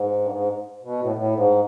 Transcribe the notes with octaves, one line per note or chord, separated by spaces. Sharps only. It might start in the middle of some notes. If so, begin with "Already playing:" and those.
Already playing: G#2
G2
G#2
B2
A2
A2
G#2